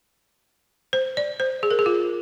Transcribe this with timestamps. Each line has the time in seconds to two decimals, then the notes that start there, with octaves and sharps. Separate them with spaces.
0.93 C5
1.17 D5
1.40 C5
1.63 G#4
1.71 A#4
1.79 G#4
1.86 F4